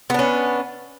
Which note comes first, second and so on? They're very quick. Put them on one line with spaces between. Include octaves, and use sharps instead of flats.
B3 D4 C#4